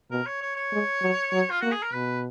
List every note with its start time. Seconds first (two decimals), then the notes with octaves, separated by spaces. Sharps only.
0.11 B2 A#4
0.26 C#5
0.41 C#5
0.56 C#5
0.72 G#3
1.02 F#3
1.33 F#3
1.50 F4
1.61 A#3 F#4
1.71 G#4
1.83 A#4
1.93 B2 B4